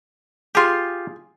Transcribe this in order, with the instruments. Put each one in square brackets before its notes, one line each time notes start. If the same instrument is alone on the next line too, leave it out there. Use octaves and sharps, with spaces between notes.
[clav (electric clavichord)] F4 G4 [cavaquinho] G#4 C6